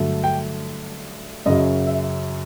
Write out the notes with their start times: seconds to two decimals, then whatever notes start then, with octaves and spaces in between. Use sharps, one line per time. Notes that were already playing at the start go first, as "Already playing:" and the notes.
Already playing: G2 D3 F#3 A3
0.24 G5
1.46 F#2 C#3 F#3 D#5
1.87 E5